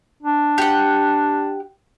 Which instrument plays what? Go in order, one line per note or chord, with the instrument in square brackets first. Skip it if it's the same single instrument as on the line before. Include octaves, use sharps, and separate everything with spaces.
[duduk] D4
[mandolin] G4 F#5